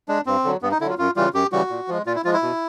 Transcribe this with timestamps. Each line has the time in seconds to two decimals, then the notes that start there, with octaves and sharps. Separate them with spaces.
0.08 G#3 D4
0.26 G2 C4
0.44 D3 F#3
0.62 G2 B3
0.72 D#4
0.81 D3 E4
0.85 F#3 F4
0.98 F#2 F4
1.16 C#3 E3 G3 F4
1.34 F#2 G4
1.52 C#3 E3 G3 F#4
1.70 A#2
1.88 F3 G#3
2.06 A#2 F4
2.15 E4
2.25 F3 G#3 F4
2.33 E4
2.42 B2